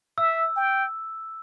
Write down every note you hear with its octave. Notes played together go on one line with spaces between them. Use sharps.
E5 E6
G5